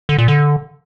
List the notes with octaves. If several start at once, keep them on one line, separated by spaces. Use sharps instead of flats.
D3
A#2
D3